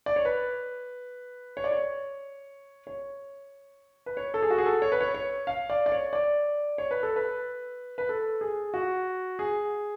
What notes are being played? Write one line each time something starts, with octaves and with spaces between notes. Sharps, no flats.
D5
C#5
B4
C#5
D5
C#5
C#5
B4
C#5
A4
G#4
F#4
G#4
A4
C#5
B4
C#5
C#5
F5
D5
D5
C#5
D5
C#5
B4
A4
B4
B4
A4
G#4
F#4
G#4